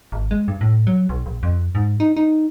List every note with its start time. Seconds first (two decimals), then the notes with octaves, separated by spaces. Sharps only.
0.12 G#1
0.31 G#3
0.48 G2
0.61 A2
0.87 F#3
1.09 B1
1.26 A#1
1.43 F2
1.75 G#2
2.00 D#4
2.17 D#4